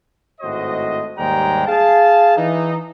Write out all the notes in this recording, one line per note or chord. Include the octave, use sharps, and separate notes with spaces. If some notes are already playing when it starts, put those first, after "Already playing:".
G#1 A2 F#4 C5 D#5
D#2 G#2 G3 G#3 G5 A#5
G#4 F5 A5
E3 D#4